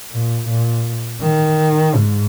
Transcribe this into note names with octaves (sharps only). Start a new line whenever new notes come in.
A#2
A#2
D#3
G#2